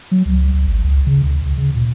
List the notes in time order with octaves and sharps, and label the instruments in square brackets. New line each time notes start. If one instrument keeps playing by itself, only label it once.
[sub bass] F#3
C#2
C#2
G#1
C#2
C#3
D2
D2
C#3
A#2